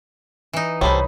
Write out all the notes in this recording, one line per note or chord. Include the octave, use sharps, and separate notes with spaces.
E3 D#4
C2 G3 A4 C5 C#5 B5